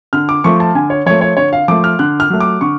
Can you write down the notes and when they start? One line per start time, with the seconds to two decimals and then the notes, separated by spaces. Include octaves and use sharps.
0.13 D3 F6
0.29 D6
0.44 F3 A3 C#6
0.60 A5
0.75 D3 G#5
0.90 C#5
1.06 F3 A3 C#5
1.21 C#5
1.37 D3 C#5
1.53 F5
1.68 F3 A3 D6
1.84 F6
1.99 D3 F#6
2.20 F6
2.30 F#3 A3
2.40 D6
2.61 D3 C#6